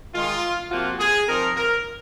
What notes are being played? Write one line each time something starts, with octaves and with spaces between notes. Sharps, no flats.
D#3 G#3 D#4 F4
C3 F3 A#3 F4 F#4
G#4
F3 C4 D#4 A#4
A#4